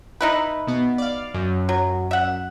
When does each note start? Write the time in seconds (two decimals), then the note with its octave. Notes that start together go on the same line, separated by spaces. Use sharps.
0.21 D#4 E4 B4
0.67 B2 B3
0.98 D5 F5
1.34 F#2
1.69 F#3
2.11 E5 F#5